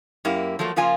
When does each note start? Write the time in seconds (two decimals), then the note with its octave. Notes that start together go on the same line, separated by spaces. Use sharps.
0.25 F#2 A#3 E4 G4
0.59 F3 F#3 A3 A#3
0.76 C#3 F3 A#3 F4 G#5